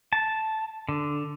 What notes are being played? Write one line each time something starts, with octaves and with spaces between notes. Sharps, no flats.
A5
D3